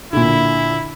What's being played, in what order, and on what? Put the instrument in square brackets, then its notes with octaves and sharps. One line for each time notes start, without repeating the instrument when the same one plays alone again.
[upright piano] A#2 D3 [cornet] E4